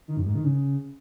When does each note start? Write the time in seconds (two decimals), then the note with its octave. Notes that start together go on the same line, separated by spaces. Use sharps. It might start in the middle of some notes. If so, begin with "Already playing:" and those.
0.08 D#3
0.17 F#2
0.26 G#2
0.35 D#3
0.44 C#3